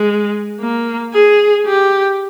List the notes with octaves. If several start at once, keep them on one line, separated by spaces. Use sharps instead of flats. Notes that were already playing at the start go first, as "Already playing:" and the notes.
Already playing: G#3
A#3
G#4
G4